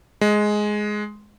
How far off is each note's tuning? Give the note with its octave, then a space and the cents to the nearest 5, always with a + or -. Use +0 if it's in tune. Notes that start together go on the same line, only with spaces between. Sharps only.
G#3 +10